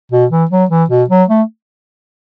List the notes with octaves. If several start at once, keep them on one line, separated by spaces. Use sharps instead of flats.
B2
E3
F#3
E3
B2
F#3
A3